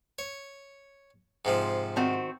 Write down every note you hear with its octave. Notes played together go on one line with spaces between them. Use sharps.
C#5
G#2 C3 F3
D#3 C4 F#4